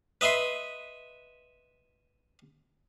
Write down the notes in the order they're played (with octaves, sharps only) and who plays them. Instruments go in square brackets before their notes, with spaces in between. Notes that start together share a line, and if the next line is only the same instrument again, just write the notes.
[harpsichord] B4 D#5 E5 B5 C6